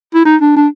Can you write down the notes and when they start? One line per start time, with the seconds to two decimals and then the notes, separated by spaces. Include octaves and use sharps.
0.15 E4
0.25 D#4
0.41 D4
0.56 D4